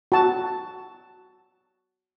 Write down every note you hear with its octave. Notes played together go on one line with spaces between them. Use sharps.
F#4 A5